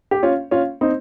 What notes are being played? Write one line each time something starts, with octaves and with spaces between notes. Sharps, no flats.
G4
C#4 F4
C#4 F4
C4 D#4